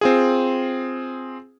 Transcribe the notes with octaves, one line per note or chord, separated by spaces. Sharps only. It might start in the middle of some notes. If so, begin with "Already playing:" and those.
C4 F4 G#4